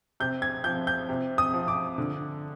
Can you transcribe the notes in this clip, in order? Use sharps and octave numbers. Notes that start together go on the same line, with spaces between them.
C3 G6
G#6
F3 G6
G6
C3
D#6
F3
D6
D3